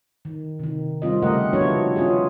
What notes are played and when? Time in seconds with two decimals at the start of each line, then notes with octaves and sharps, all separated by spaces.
0.25 D#3
0.59 C3 D#3
1.02 G3 C4 F4 D#5
1.22 C#3 A3 G4 A#4 D#5 F#5
1.53 F3 B3 D4 E4 F#4 C#5
1.96 C#4 F4 F#4 G#4